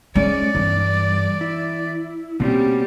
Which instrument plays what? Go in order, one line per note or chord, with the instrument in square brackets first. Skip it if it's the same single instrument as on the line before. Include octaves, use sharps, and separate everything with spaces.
[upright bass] G#3 [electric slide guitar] C#4 [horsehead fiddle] D5
[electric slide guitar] G2 [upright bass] E3 B3
[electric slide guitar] E4
[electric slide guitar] B2 C4 C#4 [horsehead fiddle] G3 [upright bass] A#3